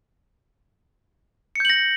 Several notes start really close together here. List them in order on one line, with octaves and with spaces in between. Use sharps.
C#7 G6 F#7 A#6